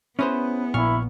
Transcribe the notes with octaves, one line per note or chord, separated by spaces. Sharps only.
B3 C#4 E4 G#4 B4 C5
A#1 A#2 E4 C#6 F6